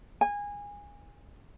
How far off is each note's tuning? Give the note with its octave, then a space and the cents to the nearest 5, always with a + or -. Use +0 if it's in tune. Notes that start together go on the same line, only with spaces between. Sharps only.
G#5 -20